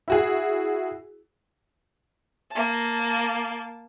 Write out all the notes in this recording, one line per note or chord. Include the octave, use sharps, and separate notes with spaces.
E4 F#4 G#4
A#3 A5